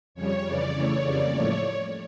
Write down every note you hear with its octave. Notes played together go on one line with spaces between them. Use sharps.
F2 C#3 G3 C#5
F2 C#3 E3 D5
C#3 E3 A3 C#5
F2 C#3 G3 A#3 D5
A2 F3 A3 C#5